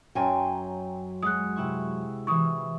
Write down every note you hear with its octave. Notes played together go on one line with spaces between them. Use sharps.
F#2 F#3 G5 G#5 C6
G#3 F#4 D#6 F#6
C3 E4 C#6
E3 E4 C#6 D#6